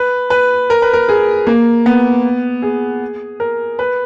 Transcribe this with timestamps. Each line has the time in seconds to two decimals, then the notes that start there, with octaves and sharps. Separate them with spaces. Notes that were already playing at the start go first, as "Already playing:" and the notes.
Already playing: B4
0.30 B4
0.70 A#4
0.82 B4
0.93 A#4
1.09 G#4
1.47 A#3
1.86 B3
2.62 G#4
3.40 A#4
3.79 B4